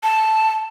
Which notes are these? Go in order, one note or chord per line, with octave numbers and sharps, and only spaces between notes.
A5